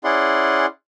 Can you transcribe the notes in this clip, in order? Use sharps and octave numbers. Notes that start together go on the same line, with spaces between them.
C#4 E4 G#4 D5 F#5 C6